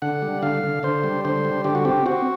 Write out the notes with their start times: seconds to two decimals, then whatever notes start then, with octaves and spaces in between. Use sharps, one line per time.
0.02 D3 F#5
0.22 G3
0.42 D3 F5
0.64 D3
0.83 D3 C5
1.04 G3
1.25 D3 C5
1.45 G3
1.64 D3 G4
1.75 F#4
1.85 C4 G4
2.06 C4 F#4